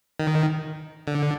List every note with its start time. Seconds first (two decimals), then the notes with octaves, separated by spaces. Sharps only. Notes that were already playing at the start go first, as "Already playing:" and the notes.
0.20 D#3
1.07 D3